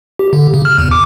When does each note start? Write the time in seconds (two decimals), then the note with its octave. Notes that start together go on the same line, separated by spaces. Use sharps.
0.19 G4
0.33 D3
0.54 C#3
0.65 F6
0.78 E2
0.91 D6